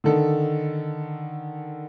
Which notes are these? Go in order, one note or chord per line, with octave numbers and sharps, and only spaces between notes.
D3 D#3 A4